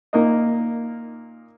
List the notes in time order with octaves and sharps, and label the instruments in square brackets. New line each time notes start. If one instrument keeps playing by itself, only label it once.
[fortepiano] A#2 A#3 D#4 A#4 D#5